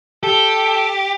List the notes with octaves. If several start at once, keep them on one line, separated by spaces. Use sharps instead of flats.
G4 A4